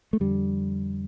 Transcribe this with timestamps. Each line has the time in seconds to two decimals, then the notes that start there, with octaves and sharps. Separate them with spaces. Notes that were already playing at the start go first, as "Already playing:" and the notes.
0.13 A3
0.20 F2 D3 G3